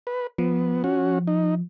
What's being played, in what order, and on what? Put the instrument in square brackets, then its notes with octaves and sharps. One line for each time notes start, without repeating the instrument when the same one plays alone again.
[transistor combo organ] B4
[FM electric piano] F3 [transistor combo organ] B3
[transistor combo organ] C#4 F#4
D#4